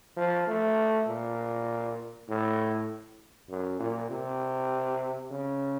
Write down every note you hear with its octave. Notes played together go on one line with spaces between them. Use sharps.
F3
A3
A#2
A2
F#2
A#2
C3
C#3